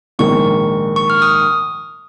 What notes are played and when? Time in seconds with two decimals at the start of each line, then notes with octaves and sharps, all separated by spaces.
0.19 A#1 G#2 D#3 A#3 C#6
0.96 C#6
1.10 F6
1.22 D#6